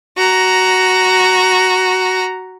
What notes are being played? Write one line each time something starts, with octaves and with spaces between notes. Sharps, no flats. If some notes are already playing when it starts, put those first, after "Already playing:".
F#4 A#5